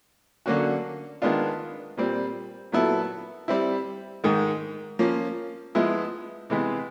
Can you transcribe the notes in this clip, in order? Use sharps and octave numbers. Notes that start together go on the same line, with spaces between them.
D3 F#3 A#3 C#4 F#4
D#3 G#3 B3 D4 F4
A#2 G3 C4
A#2 F#3 B3 E4 A4
G3 C4 E4
G#2 D#3 G#3
F3 A#3 C#4
F3 G#3 B3 E4
C3 E3 G#3 B3